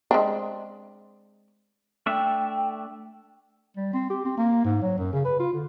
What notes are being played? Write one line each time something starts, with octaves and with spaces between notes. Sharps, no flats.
G#3 C4 D4
A3 D4 E5 G5
G3
C4
G4
C4
A#3
G#2
F#3
F#2
C#3
B4
F4
D3